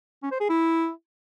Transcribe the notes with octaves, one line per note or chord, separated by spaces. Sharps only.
C#4
C5
G#4
E4